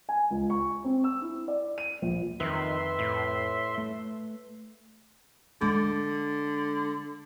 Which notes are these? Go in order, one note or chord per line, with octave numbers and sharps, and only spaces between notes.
G#5
C#2
C#6
C4
E6
E4
D5
D#7
A#1
F2 D#3 B4 E5 C6
A2
A3
D3 G#3